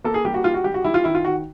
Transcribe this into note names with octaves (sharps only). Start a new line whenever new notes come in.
A#3 A4
G#4
G3 G4
F#4
G3 F4
F#4
G3 G4
F#4
G3 E4
F4
D#3 E4
F4
D#3 F#4